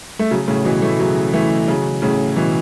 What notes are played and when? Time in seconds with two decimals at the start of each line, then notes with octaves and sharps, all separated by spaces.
0.19 A3
0.31 C#3 F#3
0.48 A2 C#3
0.65 B2 E3
0.82 E3 A3
0.99 C#3 F#3
1.33 E3 A3
1.68 C#3 F#3
2.02 A2 C#3
2.36 B2 E3